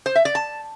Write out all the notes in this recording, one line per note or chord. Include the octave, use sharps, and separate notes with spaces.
C5
E5
D5
A5